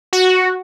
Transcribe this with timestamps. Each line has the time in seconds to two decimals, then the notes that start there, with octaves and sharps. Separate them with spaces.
0.13 F#4